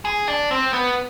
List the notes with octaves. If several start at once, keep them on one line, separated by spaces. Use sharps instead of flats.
G#4
D4
C4
B3